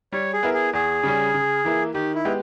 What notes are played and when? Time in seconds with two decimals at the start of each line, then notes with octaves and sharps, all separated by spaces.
0.12 G3 C#5
0.33 G#4
0.43 B3 E4 A#4
0.54 G#4
0.73 E2 G#4
1.03 C#3 G3 C#4
1.34 C#3
1.65 E3 A#3 E4
1.94 D#3 G4
2.15 E4
2.25 G#3 B3 G4